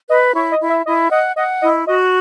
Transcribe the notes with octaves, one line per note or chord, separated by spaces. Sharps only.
B4 D#5
E4 C#5
D#5
E4
E5
E4 D#5
D#5 F#5
D#5 F#5
E4 D#5
F#4 D#5